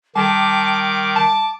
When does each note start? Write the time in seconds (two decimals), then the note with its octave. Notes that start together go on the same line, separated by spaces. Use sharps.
0.16 D#3 G3 A5 D6
1.16 A5